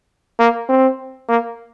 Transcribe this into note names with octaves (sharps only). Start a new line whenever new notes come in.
A#3
C4
A#3